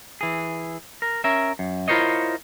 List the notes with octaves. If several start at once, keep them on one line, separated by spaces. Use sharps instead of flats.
E3 G#4
A#4
C#4 A#4 E5
F#2
E4 F4 A#4 C5 C#5 D#5